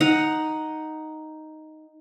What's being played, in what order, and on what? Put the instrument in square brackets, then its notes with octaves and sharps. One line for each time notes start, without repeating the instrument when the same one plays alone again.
[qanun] D#4 F#5